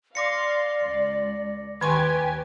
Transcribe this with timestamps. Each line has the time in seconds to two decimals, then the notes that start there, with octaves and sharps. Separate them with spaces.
0.15 D5 F5 C6 D6 A#6 C#7
0.82 C#2
1.81 D#2 D#3 G4 B4 G#5 C6 C#6